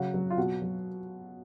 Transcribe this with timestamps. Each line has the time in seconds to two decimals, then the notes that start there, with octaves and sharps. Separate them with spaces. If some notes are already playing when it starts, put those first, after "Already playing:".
Already playing: C#3 F#3 F#4
0.14 F#3
0.30 F4
0.37 B2 F#4
0.62 F#3